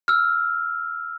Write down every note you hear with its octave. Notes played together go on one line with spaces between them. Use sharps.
E6 F6